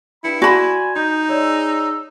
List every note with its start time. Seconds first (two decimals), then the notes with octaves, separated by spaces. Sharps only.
0.24 G2 E4 B5 C#7
0.42 F#4 D5 G#5 B5 C6 E7
0.96 D#4 D#5 G6
1.29 G#3 C#5 D5 E6